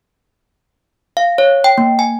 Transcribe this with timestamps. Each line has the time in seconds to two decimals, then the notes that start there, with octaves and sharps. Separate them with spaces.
1.17 F5
1.38 C#5
1.64 G5
1.78 A#3
1.99 G#5